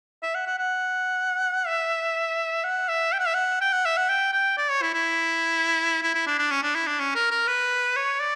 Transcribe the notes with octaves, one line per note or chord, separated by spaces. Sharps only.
E5
F#5
F#5
F#5
E5
F#5
E5
G5
F#5
E5
F#5
G5
F#5
E5
F#5
G5
G5
D5
C#5
E4
E4
E4
E4
D4
D4
C#4
D4
E4
D4
C#4
A#4
A#4
B4
C#5
D5